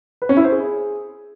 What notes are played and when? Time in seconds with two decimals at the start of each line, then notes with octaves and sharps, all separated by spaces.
0.22 B4
0.29 C#4
0.37 E4
0.44 C5
0.52 G#4